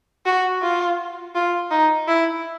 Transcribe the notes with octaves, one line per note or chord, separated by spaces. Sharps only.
F#4
F4
F4
D#4
E4